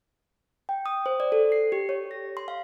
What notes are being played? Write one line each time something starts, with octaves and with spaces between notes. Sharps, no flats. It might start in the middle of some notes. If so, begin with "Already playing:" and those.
G5
D#6
C5
D5
A4
C7
G4
C#5
A#6
C6
F5